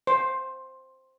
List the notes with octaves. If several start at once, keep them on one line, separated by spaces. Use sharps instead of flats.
C5